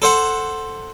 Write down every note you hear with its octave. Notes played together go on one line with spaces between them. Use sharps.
A4 C5 F#5